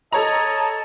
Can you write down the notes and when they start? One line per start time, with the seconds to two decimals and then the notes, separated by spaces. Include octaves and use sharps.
0.12 A4 C#5 D#5 A5 A#5